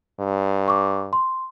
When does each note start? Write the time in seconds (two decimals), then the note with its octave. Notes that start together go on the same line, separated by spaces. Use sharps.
0.20 G2
0.68 C#6 D6
1.13 C6